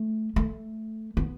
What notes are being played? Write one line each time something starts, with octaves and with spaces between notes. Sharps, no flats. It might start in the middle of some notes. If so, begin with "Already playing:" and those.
Already playing: A3
A3
B3